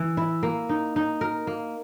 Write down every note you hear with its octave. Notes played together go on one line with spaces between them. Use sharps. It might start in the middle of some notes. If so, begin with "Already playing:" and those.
Already playing: E3
E4
A#3
D#4
D#4
A#4
A#3